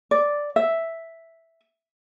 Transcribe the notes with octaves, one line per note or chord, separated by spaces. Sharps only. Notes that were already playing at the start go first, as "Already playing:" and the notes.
D5
E5